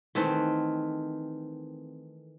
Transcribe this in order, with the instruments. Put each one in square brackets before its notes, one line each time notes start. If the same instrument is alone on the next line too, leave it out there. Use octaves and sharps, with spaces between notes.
[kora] D#3 E3 A3 C4